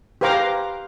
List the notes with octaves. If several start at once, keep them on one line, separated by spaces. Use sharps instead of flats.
G4 B4 C5 F5 A#5 D6